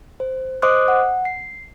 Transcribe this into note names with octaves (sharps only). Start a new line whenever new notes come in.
C5
C5 D#5 C6 D6 D#6 F#6
F#5
C7